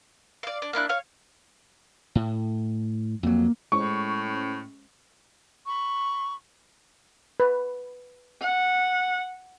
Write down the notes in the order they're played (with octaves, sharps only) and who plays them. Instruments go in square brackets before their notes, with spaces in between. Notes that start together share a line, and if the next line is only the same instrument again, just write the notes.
[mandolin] D5 F5
D4
A#3 D4 E4 F#6
C#5 F5
[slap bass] A2
[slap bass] F2 F#3 [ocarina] A#3
[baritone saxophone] A2 [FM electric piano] G#3 C#4 C5 [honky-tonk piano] C#6
[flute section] B5 C#6
[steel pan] B4
[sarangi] F#5